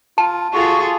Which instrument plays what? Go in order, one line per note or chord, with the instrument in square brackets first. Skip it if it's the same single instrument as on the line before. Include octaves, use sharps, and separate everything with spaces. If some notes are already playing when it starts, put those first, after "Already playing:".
[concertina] F4 [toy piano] A5
[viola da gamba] F4 G#4 A4 [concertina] F#4